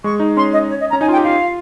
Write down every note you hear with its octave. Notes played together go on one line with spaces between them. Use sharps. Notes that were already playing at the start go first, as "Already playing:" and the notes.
G#3 C#6
D#4
C#4 C6
D#5
C#5
D#5
A#5
C#4
D#4 G#5
F4
G5
G4
F4 F5